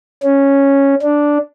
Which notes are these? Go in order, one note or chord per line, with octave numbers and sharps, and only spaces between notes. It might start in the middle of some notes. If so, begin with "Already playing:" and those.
C#4
D4